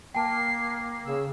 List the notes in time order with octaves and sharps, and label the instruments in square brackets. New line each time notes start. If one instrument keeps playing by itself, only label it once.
[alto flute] A#3 [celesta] G5 A5 [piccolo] C7
[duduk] C#3 [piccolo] E6